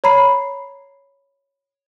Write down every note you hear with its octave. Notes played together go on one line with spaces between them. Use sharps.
C#5 A#5 B5 C7